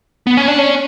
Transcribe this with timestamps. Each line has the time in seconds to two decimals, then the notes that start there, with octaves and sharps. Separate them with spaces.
0.27 B3
0.37 C#4
0.48 D4
0.58 C#4